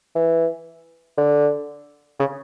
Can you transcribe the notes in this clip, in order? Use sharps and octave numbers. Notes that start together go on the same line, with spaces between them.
E3
D3
C#3